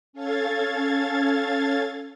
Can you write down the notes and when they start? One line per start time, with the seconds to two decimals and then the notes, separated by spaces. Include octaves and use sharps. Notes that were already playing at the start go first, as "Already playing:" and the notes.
0.13 C#4 A4 F5 G#6 A6